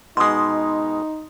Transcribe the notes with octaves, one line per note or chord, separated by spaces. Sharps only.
B2 G#3 D#4 C6 D#6